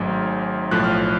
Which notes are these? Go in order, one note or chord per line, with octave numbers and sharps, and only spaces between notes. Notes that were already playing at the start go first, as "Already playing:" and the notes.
Already playing: G#1 G#2 F#3 A3 C#4
B1 A2 F3 F#6
F6